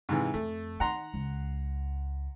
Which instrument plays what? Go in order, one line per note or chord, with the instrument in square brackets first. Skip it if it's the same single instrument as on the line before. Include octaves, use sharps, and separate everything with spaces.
[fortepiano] G#2 C3 E3
[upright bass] F2 [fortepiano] A3
[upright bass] D#3 [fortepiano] F#5 A#5 C6
[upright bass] C#2